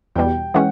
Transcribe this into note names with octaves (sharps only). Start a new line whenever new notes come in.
E2 B2 G3 G5
E3 G#3 C#4 F#5